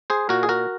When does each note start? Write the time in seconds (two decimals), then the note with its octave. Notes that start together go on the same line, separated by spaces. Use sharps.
0.10 G#4 C5
0.29 A#2 F#4 A#4
0.43 G#4
0.49 F#4 A#4